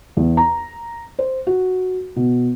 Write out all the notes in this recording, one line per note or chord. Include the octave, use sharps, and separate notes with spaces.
E2
A#5
C5
F#4
B2